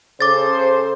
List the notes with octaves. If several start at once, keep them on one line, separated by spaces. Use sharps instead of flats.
C#3 A4 C5 D6 A6